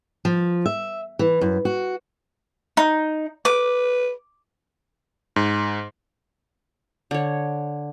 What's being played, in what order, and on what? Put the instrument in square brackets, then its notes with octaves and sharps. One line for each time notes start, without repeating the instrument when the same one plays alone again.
[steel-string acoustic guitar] F3
E5
E3
F#2
F#4
[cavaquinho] D#4
[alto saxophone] B4 [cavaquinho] D6
[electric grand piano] G#2
[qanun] D3 C#5